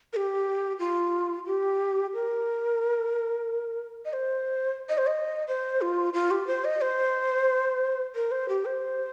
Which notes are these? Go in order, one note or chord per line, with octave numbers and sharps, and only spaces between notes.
A#4
G4
F4
G4
A#4
D#5
C5
D#5
C5
D#5
C5
F4
F4
G4
C5
D#5
C5
A#4
C5
G4
C5